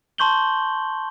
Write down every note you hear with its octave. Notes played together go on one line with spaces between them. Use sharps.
A5 C6 C#6 G6 F#7 G7